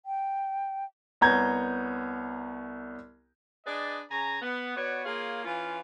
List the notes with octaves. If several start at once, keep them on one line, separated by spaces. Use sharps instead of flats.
G5
C2 B3 C#5 A#5 G6 G#6
D4 G#4 B4 D5 D#5
C#3 G#5 A#5
B3
B3 F#4 B4 C#5 D5
A#3 F4 G#4 C#5 F5
E3 C#4 F4